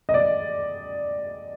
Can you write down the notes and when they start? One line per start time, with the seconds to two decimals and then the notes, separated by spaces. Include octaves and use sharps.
0.09 D#5
0.14 D5